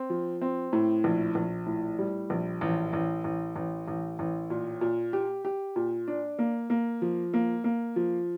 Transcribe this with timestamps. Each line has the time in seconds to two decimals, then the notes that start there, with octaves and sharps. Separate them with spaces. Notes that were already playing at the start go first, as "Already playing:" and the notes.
Already playing: C4
0.10 F3
0.42 C4
0.73 A2
1.04 A#1
1.35 A#1
1.67 A2
1.99 G3
2.30 A#1
2.61 A1
2.93 A1
3.24 A1
3.56 A1
3.88 A1
4.19 A1
4.50 A#2
4.81 A#2
5.13 G4
5.45 G4
5.76 A#2
6.08 D4
6.39 A#3
6.70 A#3
7.02 F3
7.34 A#3
7.64 A#3
7.96 F3